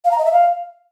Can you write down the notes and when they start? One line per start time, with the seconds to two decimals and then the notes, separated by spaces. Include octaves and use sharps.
0.05 F5
0.11 A#5
0.18 D#5
0.25 E5
0.32 F5